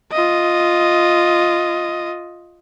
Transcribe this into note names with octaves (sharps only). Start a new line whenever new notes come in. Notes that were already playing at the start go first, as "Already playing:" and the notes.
F4 D#5